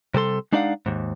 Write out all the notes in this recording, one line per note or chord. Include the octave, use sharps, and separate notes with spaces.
C3 G3 A4 C6
G#3 D4 D#4 D5 F5 F#5
D#2 G#2